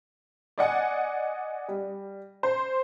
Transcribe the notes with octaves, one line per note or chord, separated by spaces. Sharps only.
D5 D#5 F#5 G#5
G3
C5